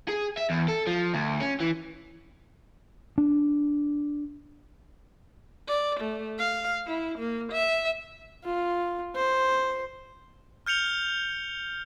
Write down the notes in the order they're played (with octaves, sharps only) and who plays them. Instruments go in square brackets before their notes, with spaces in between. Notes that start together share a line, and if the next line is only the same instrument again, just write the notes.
[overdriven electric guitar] G#4
E5
E2
A4
F3
D2
C#4
E3
[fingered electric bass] D4
[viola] D5
A3
F5
E4
A#3
E5
[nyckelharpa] F4
C5
[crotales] F6 G6 C#7 F7 G7